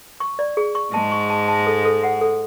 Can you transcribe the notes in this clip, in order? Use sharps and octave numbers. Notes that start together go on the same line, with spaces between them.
C#6
D5
G#4
C#6
G#2 G#3 A5
C#6
A5
A5
A4
A4
F#5
A4